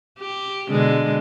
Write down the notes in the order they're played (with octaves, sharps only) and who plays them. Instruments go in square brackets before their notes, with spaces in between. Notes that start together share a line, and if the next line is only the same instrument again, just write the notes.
[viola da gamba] G4
B2 D3 G#3